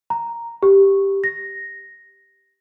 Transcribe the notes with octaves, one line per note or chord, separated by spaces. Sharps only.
A#5
G4
A#6